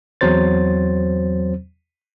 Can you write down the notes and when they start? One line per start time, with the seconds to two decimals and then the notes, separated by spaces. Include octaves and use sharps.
0.21 E2 F#3 C4 C5 A6